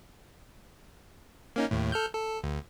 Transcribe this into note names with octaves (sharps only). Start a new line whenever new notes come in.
A#3 C#4 D#4
D#2 A2
A4 F6 G6
A4
D2